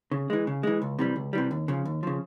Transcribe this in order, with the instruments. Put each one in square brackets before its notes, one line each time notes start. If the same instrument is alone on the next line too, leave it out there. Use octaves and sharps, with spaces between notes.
[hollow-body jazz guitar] C#3
E3 G#3
C#3
E3 G#3
C#2
C3 E3 G3
C#2
C3 E3 G3
D#2
C#3 F3
D#2
C#3 F3